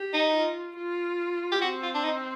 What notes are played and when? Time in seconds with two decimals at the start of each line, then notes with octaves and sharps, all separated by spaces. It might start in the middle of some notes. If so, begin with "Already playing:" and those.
Already playing: G4
0.13 D#4
0.35 F4
0.77 F4
1.52 G4
1.61 C4 F#4
1.83 F4
1.94 D4
2.04 D#4